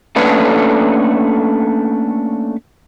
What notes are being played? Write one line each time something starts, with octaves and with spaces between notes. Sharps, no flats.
A3 A#3 C#4 D4 A4 B4